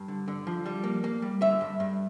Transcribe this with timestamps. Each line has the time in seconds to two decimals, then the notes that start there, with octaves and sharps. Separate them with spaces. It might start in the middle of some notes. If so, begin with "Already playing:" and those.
Already playing: G2
0.08 D3
0.28 D3
0.47 F3
0.66 G3
0.84 A#3
1.04 A#3
1.22 G3
1.41 D3 E5
1.61 G2
1.80 G2